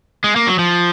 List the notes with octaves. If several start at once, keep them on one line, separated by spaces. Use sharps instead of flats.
G#3
A#3
F#3
F3